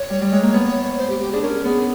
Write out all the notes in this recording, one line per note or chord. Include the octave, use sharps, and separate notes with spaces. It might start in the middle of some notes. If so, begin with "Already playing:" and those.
Already playing: C#5
G3
G3
G#3
A#3
B3
C#5
C5
G4
G4
D4 G#4
C#4 A#4
B3 G#4